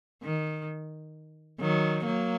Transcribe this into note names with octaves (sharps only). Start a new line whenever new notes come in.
D#3
D#3 F#3
F#3 A#3